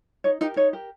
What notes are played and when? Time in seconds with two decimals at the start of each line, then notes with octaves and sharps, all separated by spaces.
0.24 D#4 C#5
0.41 D#4 G4 A#4 D#5
0.56 D#4 C#5
0.73 G4 A#4